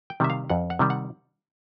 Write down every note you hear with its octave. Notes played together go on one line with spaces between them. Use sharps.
G5
C3 D#3 G3 E5
F5
F2 F#5
F#5
C3 D#3 G3
F#5